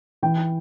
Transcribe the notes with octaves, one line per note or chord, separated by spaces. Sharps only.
E3 G5